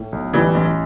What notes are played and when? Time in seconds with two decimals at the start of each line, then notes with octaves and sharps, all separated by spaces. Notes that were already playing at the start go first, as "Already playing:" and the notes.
Already playing: A2
0.12 B1
0.33 A1 E3 G3
0.55 A1